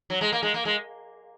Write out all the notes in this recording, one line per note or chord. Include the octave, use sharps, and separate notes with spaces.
F#3
G#3
A#3
G#3
A#3
G#3